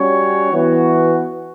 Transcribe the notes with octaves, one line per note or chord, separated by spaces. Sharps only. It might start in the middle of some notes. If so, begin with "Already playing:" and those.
Already playing: G3 C#4 F#4 C#5
E3 B3 F#4